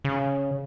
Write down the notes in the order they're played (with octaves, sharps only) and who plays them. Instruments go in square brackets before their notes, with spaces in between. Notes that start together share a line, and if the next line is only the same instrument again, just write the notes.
[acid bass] C#3